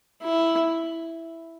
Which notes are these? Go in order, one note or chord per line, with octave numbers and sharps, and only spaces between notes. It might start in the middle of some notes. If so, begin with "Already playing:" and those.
E4